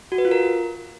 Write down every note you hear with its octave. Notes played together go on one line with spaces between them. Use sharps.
F#4
B4
F4
A#4